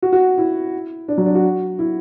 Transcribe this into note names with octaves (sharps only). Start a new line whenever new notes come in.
F#4
F#4
E4
D4
F#3
D4
F#4
E4